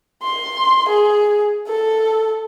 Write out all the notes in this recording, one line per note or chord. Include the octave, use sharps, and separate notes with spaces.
C6
G#4
A4